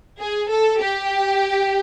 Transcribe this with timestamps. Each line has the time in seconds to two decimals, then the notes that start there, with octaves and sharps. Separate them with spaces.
0.18 G#4
0.49 A4
0.80 G4